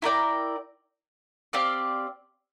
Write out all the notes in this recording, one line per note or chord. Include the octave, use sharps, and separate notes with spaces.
E4 A#4 D5 G5
C4 G4 D5 F5